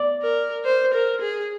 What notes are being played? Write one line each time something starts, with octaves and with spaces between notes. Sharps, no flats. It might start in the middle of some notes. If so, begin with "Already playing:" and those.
Already playing: D5
A#4
C5
A#4
G#4